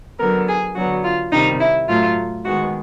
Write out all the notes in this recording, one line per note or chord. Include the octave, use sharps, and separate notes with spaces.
D3 F#3 B3 A#4
G#4
D3 F#3 B3 F#4
F4
C3 D#3 G3 D#4
E4
A2 F#3 A3 F4
D#3 G#3 B3 F#4